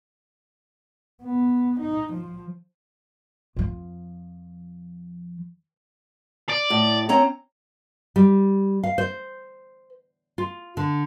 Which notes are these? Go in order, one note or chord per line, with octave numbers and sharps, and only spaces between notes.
B3
D#4
F3
F2 F3
D5
A2
C4 C#4 A#5
G3
F5
C5
F4
D3